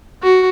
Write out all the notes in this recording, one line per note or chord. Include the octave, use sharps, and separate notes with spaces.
F#4